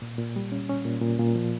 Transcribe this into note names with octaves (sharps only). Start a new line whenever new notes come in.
A#2
A#2
G3
C#4
C#4
A#2
A#2
A#2
F3